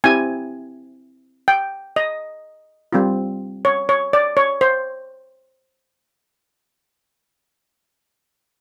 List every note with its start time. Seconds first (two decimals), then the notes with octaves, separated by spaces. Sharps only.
0.04 C4 E4 G4 G#5
1.48 G5
1.96 D#5
2.93 G3 C4 F4
3.65 C#5
3.89 C#5
4.13 D5
4.37 C#5
4.61 C5